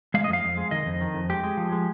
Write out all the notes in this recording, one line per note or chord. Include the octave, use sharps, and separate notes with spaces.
G#3 F5
D#5
F2
F5
F2
G#3
D#3 D#5
F2
D#3
F2
G#3 G4
G#3
F3
G#3